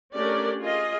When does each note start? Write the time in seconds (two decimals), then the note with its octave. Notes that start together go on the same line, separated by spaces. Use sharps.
0.15 A3 C#4 D4 G4 A#4 D5
0.60 F4 G#4 D#5